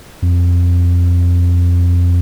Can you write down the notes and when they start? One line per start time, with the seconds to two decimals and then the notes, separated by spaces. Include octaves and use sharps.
0.22 F2